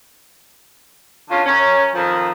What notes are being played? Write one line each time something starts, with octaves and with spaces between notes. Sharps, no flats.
D3 C#4 F4
F#2 C#4
F2 D#3 F3